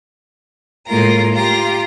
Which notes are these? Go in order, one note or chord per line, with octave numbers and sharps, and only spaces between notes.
A2 G#3 A#3 F4 A#4 A#5
F4 G4 A#5